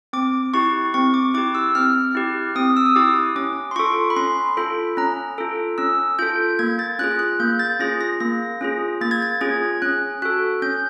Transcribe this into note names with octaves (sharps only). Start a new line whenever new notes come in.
C4 D6
E4 G4 C#6
C4 C#6
D6
E4 G4 D6
E6
C4 F6
E4 G4
C4 D#6
E6
D#6
E4 G4 D6
C#4 D6
C6
F4 A4 C#6
B5
C#4 C6
F4 A4 B5
C#4 A#5
F4 A4
C#4 E6
F4 A4 G6
A#3 G#6
A6
C#4 F4 G#4 F#6
F#6
A#3 G6
A6
C#4 F4 G#4 A#6
A#6
A#3 A#6
C#4 F4 G#4
A#3 A6
G#6
A6
C#4 F4 G#4 G#6
C#4 F#6
F#4 A4 F#6
C#4 G6